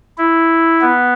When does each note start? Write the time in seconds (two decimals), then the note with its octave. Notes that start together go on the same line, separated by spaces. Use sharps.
0.18 E4
0.81 B3